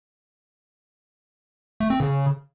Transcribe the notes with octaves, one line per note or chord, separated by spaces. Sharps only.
A3
C4
C#3